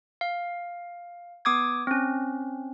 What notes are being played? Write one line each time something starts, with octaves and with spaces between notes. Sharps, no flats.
F5
B3 D6 D#6 G#6
C4 C#4